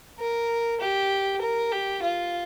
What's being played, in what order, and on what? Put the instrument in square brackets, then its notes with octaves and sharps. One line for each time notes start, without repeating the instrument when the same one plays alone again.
[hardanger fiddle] A#4
G4
A#4
G4
F4